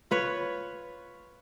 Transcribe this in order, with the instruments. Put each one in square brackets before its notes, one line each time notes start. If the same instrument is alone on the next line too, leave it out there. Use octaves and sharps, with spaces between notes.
[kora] F4 B4 C#5